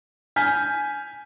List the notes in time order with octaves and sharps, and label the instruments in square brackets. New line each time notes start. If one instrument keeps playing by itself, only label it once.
[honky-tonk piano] G#5 G#6 [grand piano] F6 G6 B6